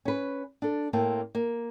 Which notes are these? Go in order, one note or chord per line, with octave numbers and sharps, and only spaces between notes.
C#4 B4
D4 A4
A2 A#3 C4 A5
A#3